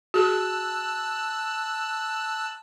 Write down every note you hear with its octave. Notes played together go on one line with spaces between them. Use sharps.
F#4 G#4 A5 E6 F#6